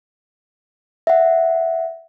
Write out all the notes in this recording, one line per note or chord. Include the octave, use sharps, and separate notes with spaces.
E5 F#5